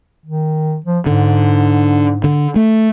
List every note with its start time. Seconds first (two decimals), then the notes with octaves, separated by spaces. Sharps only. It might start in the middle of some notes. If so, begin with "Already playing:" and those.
0.26 D#3
0.86 F3
1.06 G#2 D3
2.24 D3
2.56 A3